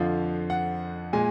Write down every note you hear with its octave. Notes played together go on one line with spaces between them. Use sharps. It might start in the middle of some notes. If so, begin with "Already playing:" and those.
Already playing: F2 D3 F3 F5
F#5
A#2 G#3 G#5